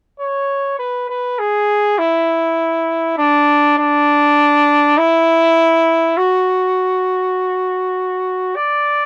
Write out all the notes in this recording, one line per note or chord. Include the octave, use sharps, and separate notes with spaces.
C#5
B4
B4
G#4
E4
D4
D4
E4
F#4
D5